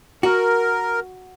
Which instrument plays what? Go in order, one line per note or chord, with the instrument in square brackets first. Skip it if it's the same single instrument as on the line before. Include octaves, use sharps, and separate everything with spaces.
[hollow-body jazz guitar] F#4 [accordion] A#4